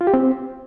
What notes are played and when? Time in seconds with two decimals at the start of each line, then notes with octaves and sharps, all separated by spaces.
0.01 F4
0.07 G4
0.14 C4